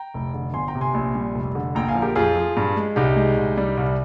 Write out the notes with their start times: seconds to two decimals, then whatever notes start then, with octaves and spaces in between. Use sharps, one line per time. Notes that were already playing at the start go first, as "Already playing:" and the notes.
Already playing: G5 A#5
0.14 F1
0.34 D3
0.54 G1 G#5 C6
0.68 G5 A#5
0.75 C3
0.81 G#5 C6
0.94 A#1
1.15 G3
1.35 F1
1.55 D3
1.75 A#1 G5 A#5
1.89 F5 G#5
1.95 F3
2.02 G4 A#4
2.16 F2 F4 G#4
2.36 F3
2.57 G2
2.77 G#3
2.96 C2 D#4 G4
3.16 G#3
3.36 C2
3.58 G3
3.77 C2